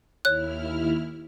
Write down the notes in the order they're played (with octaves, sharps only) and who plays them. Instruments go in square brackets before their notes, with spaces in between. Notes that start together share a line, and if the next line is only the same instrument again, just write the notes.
[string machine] D#2 E4 F6 [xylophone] C#5 F#6